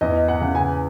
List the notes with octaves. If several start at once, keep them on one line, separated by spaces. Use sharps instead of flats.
E2 D#5
F#5
C#3
G#5